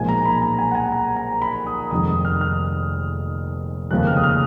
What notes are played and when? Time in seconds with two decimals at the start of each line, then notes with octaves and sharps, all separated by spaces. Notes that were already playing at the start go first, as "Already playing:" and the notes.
Already playing: B1 A#2 F3 G#3 G#5
0.09 A#5
0.25 B5
0.42 A#5
0.59 G#5
0.71 F#5
0.75 G#5
0.92 A#5
1.16 A#5
1.42 B5
1.67 D#6
1.91 F1 F2 D#3 G#3 D#6
2.08 D#6
2.25 F6
2.41 F6
3.91 F1 D#2 C#3 F3 G#3 F#6
4.07 F6
4.17 D#6
4.24 F6